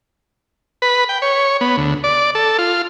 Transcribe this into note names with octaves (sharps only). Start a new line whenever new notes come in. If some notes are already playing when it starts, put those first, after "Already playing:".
B4
G5
C#5
B3
D2
D5
A4
F4